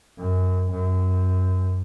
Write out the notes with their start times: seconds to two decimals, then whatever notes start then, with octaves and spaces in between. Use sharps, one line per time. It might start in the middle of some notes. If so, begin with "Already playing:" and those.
0.19 F#2
0.71 F#2